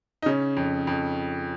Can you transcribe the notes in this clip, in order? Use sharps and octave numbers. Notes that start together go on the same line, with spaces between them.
D#4
C#3 C#4
F2
F2